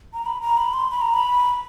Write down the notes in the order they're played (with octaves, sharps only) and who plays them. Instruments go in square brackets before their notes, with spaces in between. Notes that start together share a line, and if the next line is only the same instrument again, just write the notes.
[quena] A#5
B5
A#5
B5
C6
B5
A#5
B5